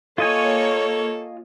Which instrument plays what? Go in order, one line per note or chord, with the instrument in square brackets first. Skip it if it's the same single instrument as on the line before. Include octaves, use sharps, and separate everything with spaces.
[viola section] A#3 C#5 [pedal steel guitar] F4 D#5 G#5 [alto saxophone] A4